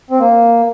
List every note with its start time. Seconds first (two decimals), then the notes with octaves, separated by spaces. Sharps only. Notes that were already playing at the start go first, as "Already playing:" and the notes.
0.11 C4
0.20 A#3